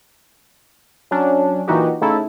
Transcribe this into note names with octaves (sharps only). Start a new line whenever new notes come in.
F#3 C#4 D4
A#2 E3 D#4 F#4 G4
C#3 A3 C#4 D#4 E4 A4